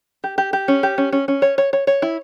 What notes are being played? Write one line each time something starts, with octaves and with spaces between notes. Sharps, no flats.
G4
G4
G4
C#4
G4
C#4
C#4
C#4
C#5
C#5
C#5
C#5
E4